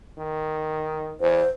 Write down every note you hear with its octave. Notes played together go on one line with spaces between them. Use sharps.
D#3
E2 C5